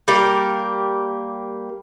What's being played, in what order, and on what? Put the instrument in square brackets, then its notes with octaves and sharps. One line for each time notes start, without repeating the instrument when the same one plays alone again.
[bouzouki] G3 A#3 G4 A#4